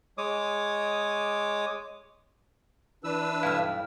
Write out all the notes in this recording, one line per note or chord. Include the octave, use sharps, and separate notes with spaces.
G#3 C#5 D6 D#6
E3 D4 B4 E6
B1 G2 E4 F5 F6